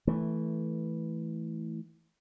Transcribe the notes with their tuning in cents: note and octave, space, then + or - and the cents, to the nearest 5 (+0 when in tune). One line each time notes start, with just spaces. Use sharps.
E3 -10 A3 +0